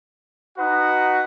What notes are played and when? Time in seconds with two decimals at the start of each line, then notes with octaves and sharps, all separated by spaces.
0.57 D#4 F#4 B4 F#5